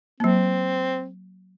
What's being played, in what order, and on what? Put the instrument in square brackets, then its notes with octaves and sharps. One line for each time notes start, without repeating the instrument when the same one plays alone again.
[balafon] F#3 A#3 [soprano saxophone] C4